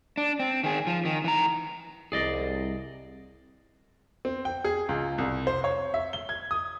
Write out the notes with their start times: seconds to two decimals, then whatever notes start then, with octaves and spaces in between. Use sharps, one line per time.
0.17 D4
0.40 C4
0.64 D#3 G#4
0.87 F3
1.05 D#3
1.24 E3 A#5
2.12 C2 G#4 D5 D#5
4.25 C4
4.45 G5
4.64 G#4
4.89 C#2
5.18 C2
5.47 C5
5.64 C#5
5.94 E5
6.13 G7
6.29 G#6
6.51 D#6